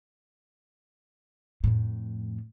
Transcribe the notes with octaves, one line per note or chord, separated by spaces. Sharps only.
F2 A2